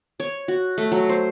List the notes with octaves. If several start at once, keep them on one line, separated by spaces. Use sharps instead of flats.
C#5
F#4
A3
F#3
C5